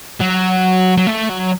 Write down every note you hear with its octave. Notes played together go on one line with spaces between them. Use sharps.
F#3
F#3
A3
F#3